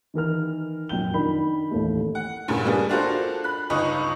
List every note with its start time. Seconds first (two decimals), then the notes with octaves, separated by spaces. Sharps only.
0.14 D#3 E3 A#4 F6
0.89 F1 F#2 A#2 G5 G6 G7
1.14 D#3 D4 D#4 A#4 B5
1.71 A1 D#2 A3
2.15 F#5
2.48 E2 G2 A#2 C#3
2.65 G3 A#3 B3 D4 G#4
2.89 D4 F4 F#4 A4 A#4 C5
3.44 B5 F#6
3.70 G1 C#2 D#4 B5 C#6 D#6